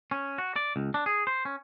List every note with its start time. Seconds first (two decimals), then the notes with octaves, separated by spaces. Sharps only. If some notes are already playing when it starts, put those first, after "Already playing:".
0.11 C#4
0.38 F#4
0.56 D5
0.76 C#2
0.94 D4
1.06 G#4
1.27 C5
1.45 C#4